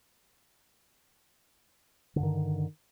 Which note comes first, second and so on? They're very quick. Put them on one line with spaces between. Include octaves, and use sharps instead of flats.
D3 G2 D#3